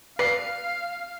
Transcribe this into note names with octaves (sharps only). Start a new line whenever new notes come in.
B4 D5 F5 C7